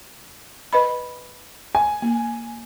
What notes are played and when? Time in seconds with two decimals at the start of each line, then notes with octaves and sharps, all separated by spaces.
0.73 B4 D#5 B5
1.75 G#5
2.02 A#3